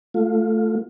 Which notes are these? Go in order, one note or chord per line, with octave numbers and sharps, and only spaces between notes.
A3 F4